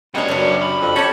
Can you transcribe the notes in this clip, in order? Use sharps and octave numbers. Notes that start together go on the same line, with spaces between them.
F#2 G3 G#3 A#3 B3 D4 C#5
F#2 C#3 G3 D4
B5
F2
C#4 G4 A4 C#5 A5